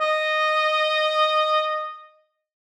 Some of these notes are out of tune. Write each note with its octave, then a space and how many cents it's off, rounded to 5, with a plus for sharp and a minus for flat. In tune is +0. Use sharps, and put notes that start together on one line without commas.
D#5 -10